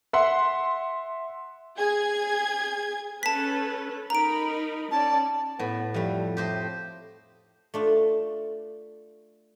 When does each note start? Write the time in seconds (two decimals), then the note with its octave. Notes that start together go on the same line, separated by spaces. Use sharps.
0.13 E5 F#5 C6
1.77 G#4 G#6
3.23 C#4 A4 B4 A5 B6
4.10 D#4 A#4 A#5 B5 D7
4.91 C#4 D5 A5
5.59 A2 B3
5.94 F2 G3 A3
6.37 A2 G4 C5 D#5
7.74 A3 D4 F4